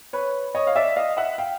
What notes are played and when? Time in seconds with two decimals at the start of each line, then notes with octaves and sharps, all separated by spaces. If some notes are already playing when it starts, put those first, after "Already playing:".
0.13 B4 C#5
0.55 C#5 D#5
0.67 F5
0.76 D5 E5
0.96 D#5 F5
1.17 E5 F#5
1.38 F5 G5